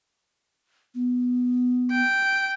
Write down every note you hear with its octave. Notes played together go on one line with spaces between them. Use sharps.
B3
G5